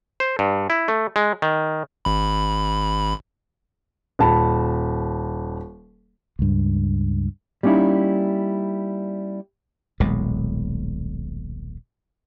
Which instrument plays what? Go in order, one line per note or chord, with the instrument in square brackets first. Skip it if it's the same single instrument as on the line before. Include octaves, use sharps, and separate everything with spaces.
[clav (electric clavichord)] C5
G2
E4
A3
G#3
D#3
[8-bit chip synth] G#1 B5
[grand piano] D#1 A5 B5
[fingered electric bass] C#2 G2
[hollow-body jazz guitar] G3 A#3 C#4 D#4 E4
[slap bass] D#1 B1 A#2 G#3